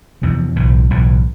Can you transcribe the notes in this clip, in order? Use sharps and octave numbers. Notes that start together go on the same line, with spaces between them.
E2 C3 F3
B1 A2 E3
B1 A2 E3